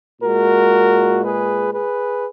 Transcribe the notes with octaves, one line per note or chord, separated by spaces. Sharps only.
A#2 G#3 F#4 A#4
G#4 B4
G#4 B4